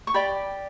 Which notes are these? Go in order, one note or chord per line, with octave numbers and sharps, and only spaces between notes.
C#6
G4 D5 G5 B5